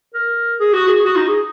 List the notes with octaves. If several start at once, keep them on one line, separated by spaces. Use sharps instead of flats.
A#4
G#4
F#4
G#4
F#4
D#4
G#4